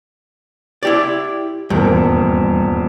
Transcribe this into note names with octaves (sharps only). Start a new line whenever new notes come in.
E4 G4 D5
D#1 E2 G2 G3 A#4